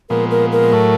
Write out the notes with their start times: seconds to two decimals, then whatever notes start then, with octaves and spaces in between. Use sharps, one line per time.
0.10 A#2 F3 G#3 B3 A#4
0.31 A#4
0.52 A#4
0.73 A2 F#3 A3